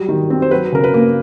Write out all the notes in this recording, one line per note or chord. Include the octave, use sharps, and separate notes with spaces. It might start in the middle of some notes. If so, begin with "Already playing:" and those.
Already playing: F#3 G3
D#3
C4
C5
F#3 B4
C#3 A#4
B4
A#3